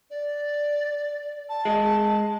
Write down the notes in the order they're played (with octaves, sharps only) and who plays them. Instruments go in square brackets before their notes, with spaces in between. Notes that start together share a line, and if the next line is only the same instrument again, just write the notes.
[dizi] D5
A5
[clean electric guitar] G#3